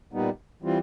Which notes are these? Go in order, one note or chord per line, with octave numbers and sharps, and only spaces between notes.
A#2 G3 B3 D#4
E3 G3 C4 F4